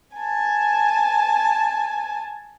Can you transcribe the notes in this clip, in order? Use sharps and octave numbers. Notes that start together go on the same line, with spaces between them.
G#5 A5